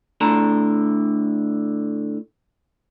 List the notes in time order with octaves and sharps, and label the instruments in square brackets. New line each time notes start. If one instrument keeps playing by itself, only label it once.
[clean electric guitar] A2 D3 A5 A#5